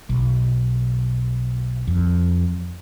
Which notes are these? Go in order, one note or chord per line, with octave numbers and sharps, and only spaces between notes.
B1
F2